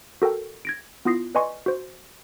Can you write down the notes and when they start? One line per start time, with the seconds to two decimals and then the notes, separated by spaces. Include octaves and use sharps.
0.22 F#4 A4 A#4 G5
0.65 G#6 A#6 D7
1.05 B3 E4 F4 D#6 A#6 C7
1.35 B4 D5 D#5 G#5 C6 C#6
1.66 F#4 C5